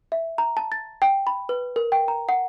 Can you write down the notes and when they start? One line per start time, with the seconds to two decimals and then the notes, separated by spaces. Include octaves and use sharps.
0.12 E5
0.38 A#5
0.57 A5
0.72 A6
1.02 G5
1.27 B5
1.49 B4
1.76 A#4
1.92 G5
2.08 A#5
2.29 F#5